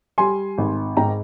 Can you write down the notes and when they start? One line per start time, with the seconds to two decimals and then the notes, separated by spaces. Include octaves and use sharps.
0.18 G3 G#5 C6
0.58 G#1
0.97 G#2 G5 A#5